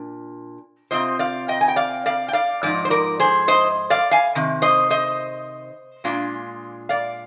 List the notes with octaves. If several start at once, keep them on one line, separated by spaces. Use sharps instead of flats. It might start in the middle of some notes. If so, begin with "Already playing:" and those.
Already playing: A#2 D4
C3 F3 C4 F4 C5 D#5
D5 F5
D#5 G5
G#5
G5
D5 F5
D5 F5
G5
D5 F5
G#2 F3 D#4 D5
C5
A#4 D5
G#4 C5
C5 D#5
D5 F5
F5 G#5
C3 D#3
C5 D#5
C5 D#5
A#2 G#3 D4 F4
D5 F5